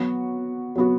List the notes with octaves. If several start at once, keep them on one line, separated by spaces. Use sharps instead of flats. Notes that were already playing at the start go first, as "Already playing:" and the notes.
Already playing: F#3 B3 F#4
F#3 B3 F#4